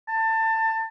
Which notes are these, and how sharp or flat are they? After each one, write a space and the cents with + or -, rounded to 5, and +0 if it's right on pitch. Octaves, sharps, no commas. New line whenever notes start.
A5 +25